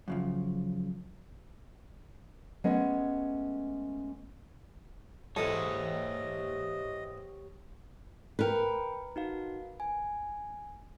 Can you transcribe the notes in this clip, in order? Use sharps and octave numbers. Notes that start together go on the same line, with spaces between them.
F#2 C#3 F3
G#3 A3 B3 C#4
G#2 E3 G4 A4 C#5 D#5 D#6
A#4 B4 G5 B5
D#4 F#4 F5
G#5